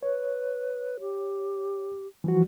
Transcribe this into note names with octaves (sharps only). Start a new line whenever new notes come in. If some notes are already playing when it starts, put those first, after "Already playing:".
B4 C#5
G4
E3 F3 G3 F#4